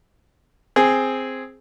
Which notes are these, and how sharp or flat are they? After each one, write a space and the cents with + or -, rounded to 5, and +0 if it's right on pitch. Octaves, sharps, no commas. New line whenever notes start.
C4 +0 G#4 +0